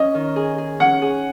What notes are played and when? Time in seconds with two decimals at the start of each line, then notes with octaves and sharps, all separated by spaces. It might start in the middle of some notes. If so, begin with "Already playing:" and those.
Already playing: C#4 D#5
0.14 D#3
0.36 G#4
0.58 G#4
0.80 C#4 F#5
1.02 G#4